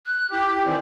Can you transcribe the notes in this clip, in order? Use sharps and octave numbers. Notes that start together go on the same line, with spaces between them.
F#6
E4 G4
D#3 E3 C4 D5